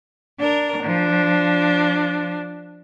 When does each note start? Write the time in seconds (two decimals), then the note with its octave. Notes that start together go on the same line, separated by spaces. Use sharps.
0.39 D4 A#4
0.84 F3 D4